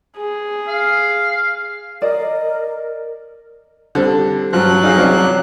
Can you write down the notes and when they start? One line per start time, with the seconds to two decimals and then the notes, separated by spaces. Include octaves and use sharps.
0.17 G#4
0.68 F5
2.02 A#4 D5 D#5
3.95 D3 G3 C4
4.53 G2 F3 F#3 F#6
4.83 D#4 G#4 F5
4.96 C2 F3 D5